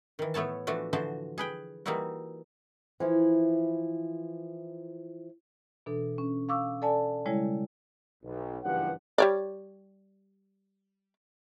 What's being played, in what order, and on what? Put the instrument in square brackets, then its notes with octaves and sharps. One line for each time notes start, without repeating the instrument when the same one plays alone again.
[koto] D#3 E3
A2 A3 B3 C#5 A5
E3 F3 A3 D4 F#4
D3 E3 F3 F#4 C5 A5
G#4 B4 G5
E3 G3 A#3 D#4 E4 F#4
[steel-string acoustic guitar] E3 F3 E4
[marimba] B2 E3 D4 A4
C#4
F5 C#6 D6 E6
A4 D5 G#5 A5
C#3 G3 G#3 E4 C#5 G#6
[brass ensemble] B1
F#1 G2 E3 F3 G4 F#5
[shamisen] G3 C#5 D5